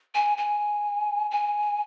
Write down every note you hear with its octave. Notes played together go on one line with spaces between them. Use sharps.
G#5
G#5
G#5